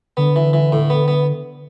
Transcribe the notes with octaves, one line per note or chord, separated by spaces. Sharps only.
D3 B3
E3
E3
A2
B3
B3